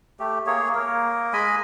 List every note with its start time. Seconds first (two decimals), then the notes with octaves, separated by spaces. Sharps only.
0.20 A3 G4
0.47 A#3 G#4 C#5
0.75 A#3 A#4
1.33 G#3 D#5 G#5 B5